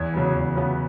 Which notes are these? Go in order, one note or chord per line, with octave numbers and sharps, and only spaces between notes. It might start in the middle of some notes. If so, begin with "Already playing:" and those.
Already playing: E2 G#6
C#3 F#3 B3
E2
C#3 F#3 B3